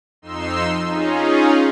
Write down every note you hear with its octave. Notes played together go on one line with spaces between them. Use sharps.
F2 D#4 C6 E6
C#4 D#4 F4 G#4